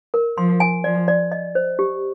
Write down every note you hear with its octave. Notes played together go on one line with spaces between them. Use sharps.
A#4
F3 C6
G#5
F3 D5
D5
D#5
C5
G4